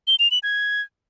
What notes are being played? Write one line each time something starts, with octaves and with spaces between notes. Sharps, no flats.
G7
F7
F#7
G#6